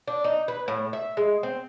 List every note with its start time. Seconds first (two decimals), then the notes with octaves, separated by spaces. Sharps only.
0.08 D4
0.24 D#4
0.48 B4
0.68 A2
0.93 E5
1.17 G#3
1.43 C4